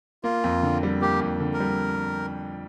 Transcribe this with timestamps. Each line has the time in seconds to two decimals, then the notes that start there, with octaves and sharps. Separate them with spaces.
0.24 A#3 F4
0.44 F2
0.63 D3
0.83 G3
1.02 A#3 G4
1.21 F2
1.40 D3
1.54 A#4
1.60 G3